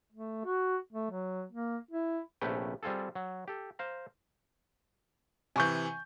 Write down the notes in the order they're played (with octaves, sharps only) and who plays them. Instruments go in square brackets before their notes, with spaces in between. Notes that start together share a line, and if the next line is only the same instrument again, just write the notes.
[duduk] A3
F#4
A3
F#3
A#3
E4
[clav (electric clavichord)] A#1 C3 A3 C#4 B4 G5
G3 C4 F4 G#4 A4
F#3
G4 A4
C5 F5 A#5
[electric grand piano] C3 E3 [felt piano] G#5 C#6 G6